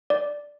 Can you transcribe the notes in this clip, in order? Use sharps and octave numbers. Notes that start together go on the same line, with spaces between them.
D5